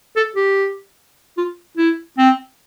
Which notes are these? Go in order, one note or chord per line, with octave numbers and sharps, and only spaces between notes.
A4
G4
F4
E4
C4